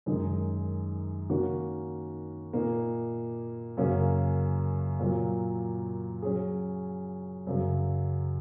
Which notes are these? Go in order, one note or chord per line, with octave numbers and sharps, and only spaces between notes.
F#2 D#3 G#3
D#3 A#3 C#4 F#4
A#2 A#3 D#4
F#2 C#3 A#3 C#4 F#4
A#2 F#3 A#3
F#3 C#4 G#4
F#2 C#3 F#3